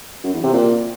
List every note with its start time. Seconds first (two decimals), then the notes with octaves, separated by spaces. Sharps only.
0.24 F#2
0.34 E2
0.43 C3
0.53 A#2